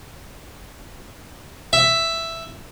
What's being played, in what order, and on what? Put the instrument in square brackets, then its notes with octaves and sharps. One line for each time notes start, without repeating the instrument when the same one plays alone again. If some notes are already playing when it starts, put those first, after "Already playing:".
[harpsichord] E5